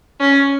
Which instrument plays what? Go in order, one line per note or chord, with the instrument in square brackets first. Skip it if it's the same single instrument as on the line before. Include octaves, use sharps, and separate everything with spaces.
[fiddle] C#4